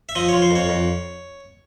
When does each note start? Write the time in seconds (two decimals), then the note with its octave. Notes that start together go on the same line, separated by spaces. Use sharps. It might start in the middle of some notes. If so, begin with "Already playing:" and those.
0.09 E5
0.15 F3 D#5
0.28 C#5
0.33 F3
0.42 C5
0.51 F2 C#5
0.69 F2